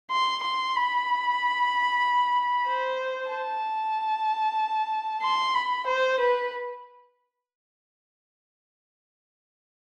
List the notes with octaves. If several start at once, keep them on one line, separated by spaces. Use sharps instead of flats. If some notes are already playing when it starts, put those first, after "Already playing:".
C6
C6
B5
C5
A5
C6
B5
C5
B4